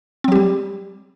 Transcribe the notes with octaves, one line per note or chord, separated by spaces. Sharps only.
F#3 G3 C4 G4